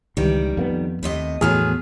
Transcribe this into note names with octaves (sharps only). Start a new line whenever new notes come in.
C#2 D#3 E3 G3
F2 A#3 B3
D#2 A2 C3 D#5
E2 A2 F3 F#3 B3 G#4 F6